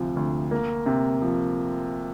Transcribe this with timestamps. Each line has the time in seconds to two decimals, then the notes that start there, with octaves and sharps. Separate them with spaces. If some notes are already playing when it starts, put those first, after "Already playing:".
Already playing: D2 C3 F3
0.16 D2
0.51 A#3
0.86 C3
1.22 F3